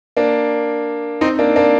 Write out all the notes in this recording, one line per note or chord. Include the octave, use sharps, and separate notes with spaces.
A#3 D4
C4 D#4
A#3 D4
A#3 D4